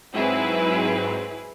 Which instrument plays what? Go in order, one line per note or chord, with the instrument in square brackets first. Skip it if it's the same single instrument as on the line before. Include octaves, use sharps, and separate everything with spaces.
[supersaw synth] G#2 F#3 C4 [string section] E4 G#4 B4